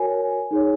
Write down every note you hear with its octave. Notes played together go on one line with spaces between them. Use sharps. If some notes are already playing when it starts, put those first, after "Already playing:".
Already playing: F#4 A#4 C#5 G#5
D#4 G#4 C#5